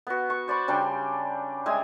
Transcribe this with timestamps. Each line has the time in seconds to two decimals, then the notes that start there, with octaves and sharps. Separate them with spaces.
0.07 B3 F#4
0.30 C#6
0.48 C5 D5 B5 C#6
0.68 C#3 G3 D4 C6
1.66 G3 G#3 E4 G#5